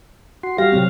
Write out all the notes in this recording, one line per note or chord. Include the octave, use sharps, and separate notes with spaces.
F#4 C6
G3 F#4 G4 F5 A#6
C3 F#3 C4